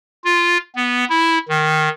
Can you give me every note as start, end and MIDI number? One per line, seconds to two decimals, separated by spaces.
0.24 0.57 65
0.75 1.04 59
1.10 1.38 64
1.49 1.89 51